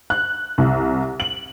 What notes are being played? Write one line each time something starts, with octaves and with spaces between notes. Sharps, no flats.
F#6
C2
F#7